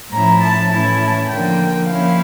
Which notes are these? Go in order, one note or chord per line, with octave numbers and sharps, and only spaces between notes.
A2 F3 C#4 E4 A#5
A5
A2 E3 A3 C#4 E4 A5
D3 F3 A#3 G5
F3 A#3 C#4 E4 F5